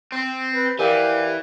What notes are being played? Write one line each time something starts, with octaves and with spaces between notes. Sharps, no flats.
C4
B4
E3 G4 A#4 C5 D5 F5 G#5